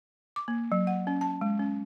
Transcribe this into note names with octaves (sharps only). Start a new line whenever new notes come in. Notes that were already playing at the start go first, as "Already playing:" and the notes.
D6
A#3
F#3
F#5
C#4
A5
G#3
C#4